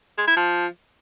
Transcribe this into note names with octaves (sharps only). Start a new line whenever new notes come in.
G#3
E4
F3